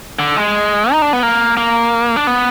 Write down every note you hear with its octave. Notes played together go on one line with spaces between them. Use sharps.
D3
G#3
D#4
D4
B3
A#3
A#3
D4
B3